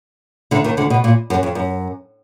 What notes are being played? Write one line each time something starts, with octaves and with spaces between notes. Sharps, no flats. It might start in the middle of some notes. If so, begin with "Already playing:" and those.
D2 D3
D#2 D#3
D2 D3
B2
A#2
F#2
F2
F#2